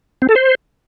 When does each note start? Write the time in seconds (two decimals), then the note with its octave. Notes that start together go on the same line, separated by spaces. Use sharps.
0.22 C4
0.29 A4
0.36 C5